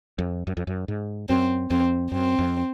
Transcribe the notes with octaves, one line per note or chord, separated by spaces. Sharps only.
F2
F#2
F2
F#2
G#2
F#2 C4
F2 C4
F#2 C4
F2